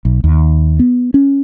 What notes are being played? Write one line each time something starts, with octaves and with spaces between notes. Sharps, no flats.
B1
D#2
B3
C#4